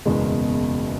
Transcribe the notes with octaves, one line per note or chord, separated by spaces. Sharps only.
F#1 E2 B2 G#3